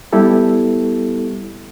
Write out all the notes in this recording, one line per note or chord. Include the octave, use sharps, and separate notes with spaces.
G3 B3 E4 G4 A4